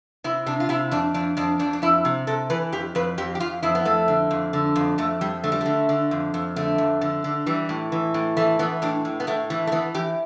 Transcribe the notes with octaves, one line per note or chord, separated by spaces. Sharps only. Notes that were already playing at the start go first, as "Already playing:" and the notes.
C3 E4
C3 D4
F4
C3 E4
F2 D4
F2 D4
F2 D4
F2 D4
D4
F2 E4
C3
C3 A4
E3 B4
F2 G4
F2 B4
F2 G4
G4
F2 F4
F2 E4
B3
F2 A3
D3
F2
D3
F2
F2 A3
F2 G3
D3 A3
G3
D3 A3
D3
F2
F2
D3 A3
F2
D3
D3
E3 G3
A2
E3
A2
E3 A3
E3 B3
A2 D4
A2
B3
A2 A3
E3 A3
A3
E3 B3
E3 G4